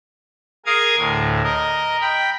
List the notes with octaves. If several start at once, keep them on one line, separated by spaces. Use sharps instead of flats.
G#4 A#4 F5 D#6 G#6
D2 A2
A#4 D#5
G5 B5